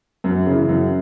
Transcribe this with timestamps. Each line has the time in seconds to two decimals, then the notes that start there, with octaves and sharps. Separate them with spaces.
0.24 F#2
0.46 C#3 E3
0.69 F#2